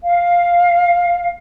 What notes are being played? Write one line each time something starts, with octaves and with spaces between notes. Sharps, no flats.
F5